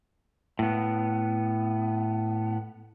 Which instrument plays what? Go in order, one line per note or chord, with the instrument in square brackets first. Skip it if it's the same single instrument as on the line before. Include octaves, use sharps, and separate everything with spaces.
[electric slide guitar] A2 B3